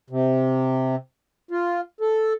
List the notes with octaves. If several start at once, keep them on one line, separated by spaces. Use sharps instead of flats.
C3
F4
A4